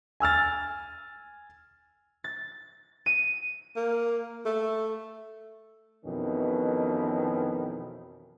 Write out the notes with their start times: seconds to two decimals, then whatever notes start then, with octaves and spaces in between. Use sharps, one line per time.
0.20 G#5 E6 F6 A6
2.24 A6
3.06 D#7
3.76 A#3
4.45 A3
6.05 F2 B2 D#3 E3 C#4